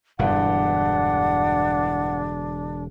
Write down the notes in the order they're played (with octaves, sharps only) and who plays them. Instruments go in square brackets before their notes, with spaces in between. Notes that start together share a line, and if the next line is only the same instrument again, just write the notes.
[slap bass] E1 D3 [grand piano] E2 G2 [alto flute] D4 [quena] F#5